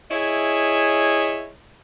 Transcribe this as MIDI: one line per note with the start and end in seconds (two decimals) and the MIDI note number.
0.11 1.51 64
0.11 1.51 68
0.11 1.51 73
0.11 1.51 75
0.11 1.51 76